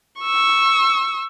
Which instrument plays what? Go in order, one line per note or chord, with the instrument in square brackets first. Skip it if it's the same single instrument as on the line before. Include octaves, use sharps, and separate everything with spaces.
[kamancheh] C#6 E6